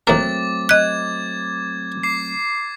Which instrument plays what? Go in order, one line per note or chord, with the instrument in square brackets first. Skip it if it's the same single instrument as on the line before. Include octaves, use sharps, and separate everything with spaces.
[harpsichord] D#2 A#4 [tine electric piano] F#3 A3 C4 [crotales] D6 A6
[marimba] D#5 F#6 [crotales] G#6
[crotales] D6 C7